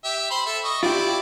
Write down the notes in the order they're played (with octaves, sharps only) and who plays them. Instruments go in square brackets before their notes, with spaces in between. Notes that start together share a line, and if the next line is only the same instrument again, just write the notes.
[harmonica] G4 E5
C5 B5 C6
A4 E5
D#5 C#6
[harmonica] E4 D5 [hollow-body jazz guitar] F4 G4